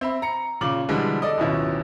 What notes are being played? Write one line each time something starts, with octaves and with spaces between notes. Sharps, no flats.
C4 E5 B5
A#5 C#7
A#2 C#3 D6 F#7
B2 D3 E3 F3 G3 G#3
A4 D5 D#5
D1 G#1 B2 C#4 E4 F4